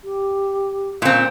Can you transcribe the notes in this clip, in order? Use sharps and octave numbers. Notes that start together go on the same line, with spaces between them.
G4
A#2 C4 F5